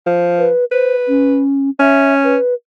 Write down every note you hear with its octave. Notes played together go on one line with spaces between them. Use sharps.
F3
B4
B4 C5
C#4
C#4 E5
B4